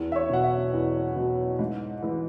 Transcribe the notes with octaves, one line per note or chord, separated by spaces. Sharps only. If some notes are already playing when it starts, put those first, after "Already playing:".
Already playing: E2
E5
C#5
B2 F#3 F#5
E5
E2
B2 F#3
G#2
E3 G#3